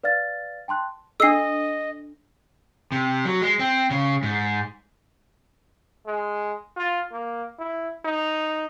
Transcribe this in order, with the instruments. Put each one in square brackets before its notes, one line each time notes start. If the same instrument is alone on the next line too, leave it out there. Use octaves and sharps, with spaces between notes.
[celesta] B4 D5 F5 F6 A6
G5 A5 C6 F#6
[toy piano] D4 A4 [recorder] D#5 [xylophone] E6 C7
[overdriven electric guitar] C3
F#3
G#3
C4
C#3
G#2
[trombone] G#3
F4
A#3
E4
D#4